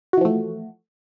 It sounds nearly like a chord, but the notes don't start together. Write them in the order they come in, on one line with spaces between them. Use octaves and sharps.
F#4 E3 F3 A3